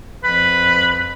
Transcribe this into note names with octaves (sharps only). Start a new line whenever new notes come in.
F2 B4